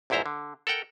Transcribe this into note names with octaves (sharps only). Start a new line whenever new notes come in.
A#1 E2 G#2 E4 C5 A#5
D3
A4 A#4 F#5 G5